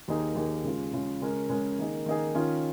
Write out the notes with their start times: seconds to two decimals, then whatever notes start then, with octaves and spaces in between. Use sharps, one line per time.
0.08 D#2 D#3 A#3 D#4 G#4
0.35 D#2 D#3 A#3 D#4 G#4
0.64 C#3 G#3 F4
0.93 C#3 G#3 F4
1.22 C#3 G#3 C#4 A#4
1.49 C#3 G#3 C#4 A#4
1.78 D#3 A#3 D#4 G#4
2.06 D#3 A#3 D#4 G#4
2.35 D#3 C#4 F4